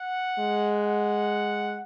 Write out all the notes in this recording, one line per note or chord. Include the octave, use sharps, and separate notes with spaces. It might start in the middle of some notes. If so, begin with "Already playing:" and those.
Already playing: F#5
G#3
F#5